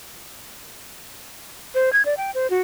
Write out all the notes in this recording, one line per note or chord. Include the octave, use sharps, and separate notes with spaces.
C5
G#6
D5
G5
C5
F#4